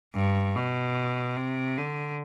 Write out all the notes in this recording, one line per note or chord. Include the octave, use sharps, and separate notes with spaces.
G2
B2
C3
D3